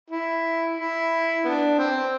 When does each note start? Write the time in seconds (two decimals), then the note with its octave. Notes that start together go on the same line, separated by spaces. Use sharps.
0.10 E4
0.78 E4
1.45 B3 D4
1.79 C4